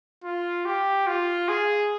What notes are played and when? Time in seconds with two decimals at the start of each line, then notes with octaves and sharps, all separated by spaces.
0.24 F4
0.65 G4
1.07 F4
1.48 G#4